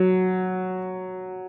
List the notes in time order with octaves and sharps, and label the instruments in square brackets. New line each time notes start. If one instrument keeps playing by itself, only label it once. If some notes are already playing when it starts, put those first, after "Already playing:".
Already playing: [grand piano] F#3